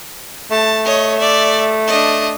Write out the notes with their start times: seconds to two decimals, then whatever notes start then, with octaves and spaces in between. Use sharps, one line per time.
0.51 A3 A5
0.84 C#5 D#5
1.19 D5 E5
1.87 D4 D#5